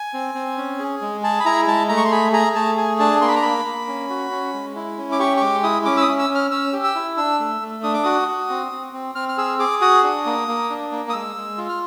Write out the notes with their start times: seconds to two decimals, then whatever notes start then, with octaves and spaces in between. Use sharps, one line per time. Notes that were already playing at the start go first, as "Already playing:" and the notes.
Already playing: G#5
0.14 C4
0.35 C4
0.58 C#4
0.79 G#4
1.01 G#3
1.23 G#4 A5
1.40 B5
1.45 E4 A#5
1.67 G#3 A5
1.89 A3 A#5
1.97 C#6
2.05 C6
2.12 G#4 B5
2.33 G#4 A#5
2.55 A3 A5
2.77 G#4 G#5
2.99 D4 A5
3.21 A#3 C6
3.28 B5
3.36 A#5
3.42 A#3 B5
3.65 A#3
3.87 C#4
4.10 F#4
4.31 C#4
4.54 G#3
4.76 E4
4.98 C#4
5.12 D6
5.19 G4 C#6
5.37 C#6
5.41 G#3 D6
5.63 E4 D#6
5.85 C#4 D6
5.97 E6
6.02 D#6
6.08 C#4
6.19 E6
6.30 C#4
6.35 F6
6.51 C#4 E6
6.73 G4
6.84 E6
6.95 E4
7.17 D4 E6
7.39 A3
7.61 A3
7.83 D4 D#6
7.94 D6
8.03 F#4 D#6
8.28 F#4
8.50 C4
8.72 C4
8.93 C4
9.15 C4 F6
9.29 F6
9.38 G#4 E6
9.59 G#4 D6
9.81 F#4 D#6
10.03 D4
10.26 A#3
10.48 A#3
10.70 D4
10.92 A#3
11.10 D#6
11.13 G#3 E6
11.36 G#3
11.58 F4
11.69 F6